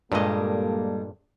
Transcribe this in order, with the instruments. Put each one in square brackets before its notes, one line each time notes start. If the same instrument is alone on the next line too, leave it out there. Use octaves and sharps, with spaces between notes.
[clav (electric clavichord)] G2 A#2 D#5 [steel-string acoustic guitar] G3 G#3 [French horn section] A#3 A4